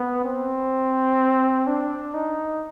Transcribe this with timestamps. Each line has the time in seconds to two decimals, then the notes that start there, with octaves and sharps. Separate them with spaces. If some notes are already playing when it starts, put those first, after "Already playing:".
Already playing: B3
0.24 C4
1.67 D4
2.14 D#4